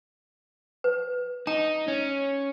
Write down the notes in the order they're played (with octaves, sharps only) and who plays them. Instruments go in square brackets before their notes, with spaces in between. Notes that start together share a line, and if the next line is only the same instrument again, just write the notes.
[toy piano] B4
[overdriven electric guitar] D#4 [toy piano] A#5
[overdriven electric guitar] C#4